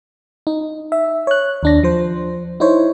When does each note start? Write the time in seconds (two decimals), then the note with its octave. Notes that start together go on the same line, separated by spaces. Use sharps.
0.47 D#4
0.92 E5
1.27 C#5 F#6
1.63 D#2 D4 A#6
1.83 F3 C5
2.60 D#4 E4 C5 C#5